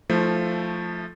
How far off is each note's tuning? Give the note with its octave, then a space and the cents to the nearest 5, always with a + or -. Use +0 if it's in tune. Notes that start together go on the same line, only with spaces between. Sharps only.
F3 +0 A3 +0 E4 -45